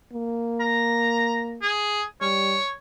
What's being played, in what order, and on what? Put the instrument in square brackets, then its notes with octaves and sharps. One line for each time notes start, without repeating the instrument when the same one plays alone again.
[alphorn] A#3
[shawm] A#5
G#4
[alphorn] G3 [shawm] C#5